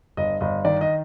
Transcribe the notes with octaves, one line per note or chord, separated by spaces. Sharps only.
G1 D#5
G1 D#5
D#3 D5
D#5